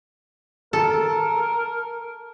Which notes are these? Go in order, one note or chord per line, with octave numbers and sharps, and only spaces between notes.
A4 A#4